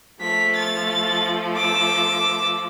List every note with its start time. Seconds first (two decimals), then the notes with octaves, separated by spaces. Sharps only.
0.21 F3 A3 B6
0.56 A6
1.57 D6 E6